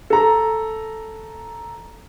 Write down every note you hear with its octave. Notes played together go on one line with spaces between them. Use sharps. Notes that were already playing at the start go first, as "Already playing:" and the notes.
A4 A#5